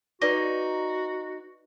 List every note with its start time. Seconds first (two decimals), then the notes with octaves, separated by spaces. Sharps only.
0.22 D#4 F#4 B4 D5 D6